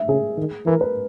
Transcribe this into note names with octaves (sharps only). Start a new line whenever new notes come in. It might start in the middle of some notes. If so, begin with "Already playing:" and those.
Already playing: E5
C#3 G#4
D#3
E3 A#4
B4